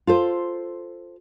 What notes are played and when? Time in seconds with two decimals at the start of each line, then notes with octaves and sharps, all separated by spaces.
0.07 F4 A4 C5